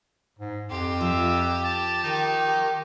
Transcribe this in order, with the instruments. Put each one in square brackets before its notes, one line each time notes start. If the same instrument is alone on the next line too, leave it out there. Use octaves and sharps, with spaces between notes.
[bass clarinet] G#2
[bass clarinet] F2 [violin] G4 [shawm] C6
[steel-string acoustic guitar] F3 [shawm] E5
[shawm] A5
[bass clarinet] D#3 [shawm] D#4